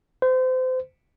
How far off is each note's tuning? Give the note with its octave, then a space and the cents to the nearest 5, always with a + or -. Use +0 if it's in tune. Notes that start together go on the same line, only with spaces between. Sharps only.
C5 -30